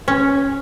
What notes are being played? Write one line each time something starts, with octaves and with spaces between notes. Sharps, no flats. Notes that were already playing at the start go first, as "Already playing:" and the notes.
C#4